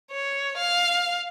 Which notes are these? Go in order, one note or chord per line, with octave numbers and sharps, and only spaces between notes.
C#5
F5